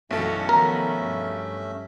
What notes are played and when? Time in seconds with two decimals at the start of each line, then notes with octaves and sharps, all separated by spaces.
0.11 B1 F#2 E3 A3 C#4 A4 C#5 E5
0.49 D#3 F3 B3 A#4
1.05 G2